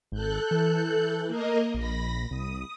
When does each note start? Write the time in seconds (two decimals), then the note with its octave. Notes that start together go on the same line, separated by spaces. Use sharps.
0.12 G#1 A4 F#6 G6
0.51 E3
1.27 A#3 A#4 D#5
1.74 A#1 B5 A#6
2.31 C2 D#6